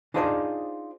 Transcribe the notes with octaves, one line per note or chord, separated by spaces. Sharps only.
D4 D#4 F4 G#4 C5 D5